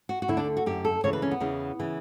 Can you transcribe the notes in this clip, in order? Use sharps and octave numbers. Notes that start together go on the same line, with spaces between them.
F#4
F#4
D2 D3 E4
D4
F#4
F#2 D3 G4
A4
D2 C#3 E3 C#5
B4
C#4
B3
E2 C#3 E3
C#3 E3